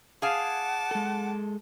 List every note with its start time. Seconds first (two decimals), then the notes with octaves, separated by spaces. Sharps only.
0.22 G#4 F5 F#5 G#5 A5 D6
0.91 G#3 A4